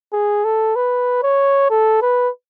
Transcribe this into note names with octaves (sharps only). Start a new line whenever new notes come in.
G#4
A4
B4
C#5
A4
B4